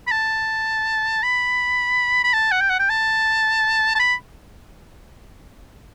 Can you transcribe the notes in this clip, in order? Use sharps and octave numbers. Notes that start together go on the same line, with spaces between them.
B5
A5
B5
B5
A5
F#5
G5
F#5
G5
A5
A5
B5